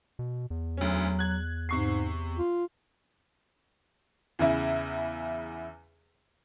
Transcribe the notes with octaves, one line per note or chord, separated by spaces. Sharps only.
B2
E2
D2 F#3 C#4
F#6 G#6
G#2 C3 C#6 C7
F4
E2 C#3 E4